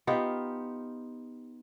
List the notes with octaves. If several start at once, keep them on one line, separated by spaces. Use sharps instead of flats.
B3 D#4 F4 G4